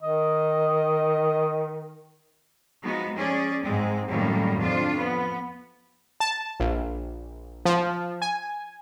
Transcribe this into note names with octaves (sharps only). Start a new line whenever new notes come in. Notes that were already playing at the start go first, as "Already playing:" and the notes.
D#3 D#5
F3 G#3 B3 D#4 F#4
F3 C#4 G#4 D5
G#2 G#3 C4
F#2 A2 D#3 F#3 G3 A#3
F2 D4 F4
B3
A5
A#1
F3
G#5